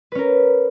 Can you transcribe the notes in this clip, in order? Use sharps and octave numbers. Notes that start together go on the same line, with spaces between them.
C#4 A#4 B4